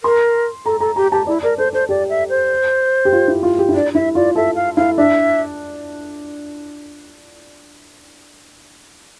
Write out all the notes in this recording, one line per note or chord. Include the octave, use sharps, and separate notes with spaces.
A#4 C6
A4 A#5
A4 A#5
G4 A#5
G4 A5
E4 D5
A#4 D5
A4 C5
A4 C5
G4 D5
E5
C5
G4
F4
E4
F4
G4
E4
D4 D5
E4 E5
F4 D5
A4 E5
F5
E4 F5
D4 E5